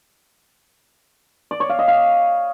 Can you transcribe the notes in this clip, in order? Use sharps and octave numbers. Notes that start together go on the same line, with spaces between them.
D5
C#5
F5
D#5
F5